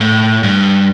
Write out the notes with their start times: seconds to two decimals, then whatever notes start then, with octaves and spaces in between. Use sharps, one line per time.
0.01 A2
0.43 G2